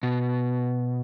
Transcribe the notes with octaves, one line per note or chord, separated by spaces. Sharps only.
B2